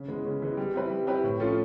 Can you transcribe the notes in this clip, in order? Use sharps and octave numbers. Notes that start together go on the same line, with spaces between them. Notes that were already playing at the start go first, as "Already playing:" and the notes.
Already playing: C#3
E3 G#3 B3
C#3
E3 G#3 B3
G3
C4 E4 G4 B4
G3
C4 E4 G4 B4
A2
F3 A3 C#4 F4